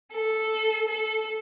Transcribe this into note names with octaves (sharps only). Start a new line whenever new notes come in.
A4
A4